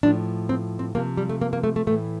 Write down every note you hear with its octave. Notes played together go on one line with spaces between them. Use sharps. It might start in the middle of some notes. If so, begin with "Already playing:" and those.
A2 F3 D4
C4
C4
C3 F3 A#3
G3
A3
A#3
A#3
A3
A3
A2 E3 A3